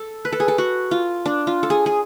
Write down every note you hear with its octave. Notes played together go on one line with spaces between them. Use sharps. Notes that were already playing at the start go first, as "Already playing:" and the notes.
Already playing: A4
B4
A4
G#4
A4
F#4
F4
D4
F4
A4
G#4
G#4